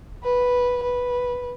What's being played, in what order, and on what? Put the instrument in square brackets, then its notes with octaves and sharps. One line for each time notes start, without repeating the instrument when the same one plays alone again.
[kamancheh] B4
B4